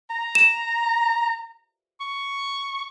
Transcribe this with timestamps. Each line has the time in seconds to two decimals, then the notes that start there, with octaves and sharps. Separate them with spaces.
0.10 A#5
0.35 E7
2.00 C#6